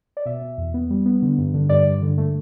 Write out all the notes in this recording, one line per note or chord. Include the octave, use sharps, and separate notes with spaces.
D5
B2 E5
B2
E2
B3
G3
B3
D3
G2
D3
G2 D5
G2
D3
A3